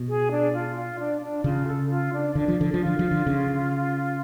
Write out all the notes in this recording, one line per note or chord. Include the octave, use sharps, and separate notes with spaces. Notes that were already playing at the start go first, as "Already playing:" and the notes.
Already playing: B2
G#4
D4
F4
F4
D4
D4
C#3 F4
A4
F4
D4
D3 D4
F3
D3
F3
F4
D3
F3
D3
C#3